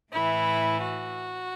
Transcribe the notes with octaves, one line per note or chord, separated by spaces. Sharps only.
A2 E3 E4
F#4